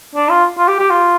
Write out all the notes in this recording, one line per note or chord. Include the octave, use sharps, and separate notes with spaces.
D4
F4
F4
G4
G4
F4